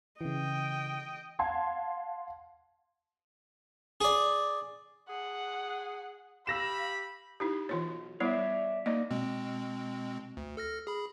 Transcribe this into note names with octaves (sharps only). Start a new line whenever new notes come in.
C#3 E3 D#5 G5
F5 F#5 A5 C6 G#6
G#4 D5
G#4 F#5
G4 F5 B5 E6 A#6 E7
D#4 E4 G4
B1 E3 F4 C#5
G3 B3 E4 C#5 D5 E5
A#3 D#4 D5 D#5
B2 G#3 C4
D2
A4 F6 A#6
G#4 B5